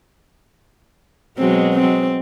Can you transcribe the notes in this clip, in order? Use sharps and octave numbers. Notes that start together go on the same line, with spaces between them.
B2 F#3 G#3 C4
C4